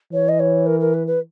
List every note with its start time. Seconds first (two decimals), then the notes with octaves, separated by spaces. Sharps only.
0.12 E3 C#5
0.28 D#5
0.39 C#5
0.66 A#4
0.80 A#4
0.93 B4
1.07 B4